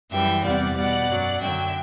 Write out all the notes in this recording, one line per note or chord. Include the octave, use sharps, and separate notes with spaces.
F#2 E3 G3 E5 G5
E2 C3 G3 D5 F#5
B2 G3 D5 F#5
F#2 F#3
F#2 D3 F#3 E5 G5